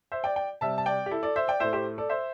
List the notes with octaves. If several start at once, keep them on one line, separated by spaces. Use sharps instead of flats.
C5 E5
D5 G5
D5 G5
C3 G3 E5 A5
A5
D5 G5
G4
E4 A4
A4 D5
C5 E5
D5 G5
A2 A3 C5 E5
G4 C5
A4 D5
C5 E5